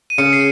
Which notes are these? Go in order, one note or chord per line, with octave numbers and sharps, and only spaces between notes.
D#7
C#3 C#7
C7